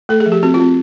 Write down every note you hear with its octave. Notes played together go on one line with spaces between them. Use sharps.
A3 A4
G#4
F3
G4
C4 F#4
F4
C4